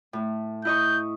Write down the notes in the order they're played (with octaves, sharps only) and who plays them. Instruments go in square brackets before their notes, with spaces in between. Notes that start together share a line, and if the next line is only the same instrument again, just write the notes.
[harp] A2
[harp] E4 D#5 C#6 [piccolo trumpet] G6